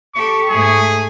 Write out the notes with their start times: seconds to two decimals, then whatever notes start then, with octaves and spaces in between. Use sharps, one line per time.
0.15 G4 A4 C#6
0.50 G#2 A3 G#4